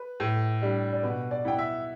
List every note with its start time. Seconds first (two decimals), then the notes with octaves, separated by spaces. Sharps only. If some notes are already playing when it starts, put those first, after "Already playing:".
Already playing: B4
0.20 A2
0.62 G3 D4
0.93 D5
1.03 B2 B4
1.31 D5
1.45 B3 E4 G5
1.58 E5